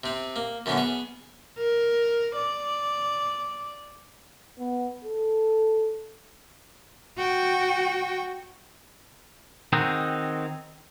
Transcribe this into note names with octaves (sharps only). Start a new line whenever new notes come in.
C3 C4
A#3
F#2 D3 E3 B3 C#4
B3 G#4
A#4
D5
B3
A4
F#4 G5
D#3 C4 D#4 F#4 G#4